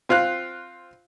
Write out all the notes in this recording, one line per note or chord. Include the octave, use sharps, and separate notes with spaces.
C4 F4 F5 F#6